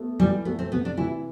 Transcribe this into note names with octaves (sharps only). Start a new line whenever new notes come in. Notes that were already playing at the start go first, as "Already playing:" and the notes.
Already playing: A3 B3
E3 G3
A3 B3
C4
C3 B3
D4
E3 E4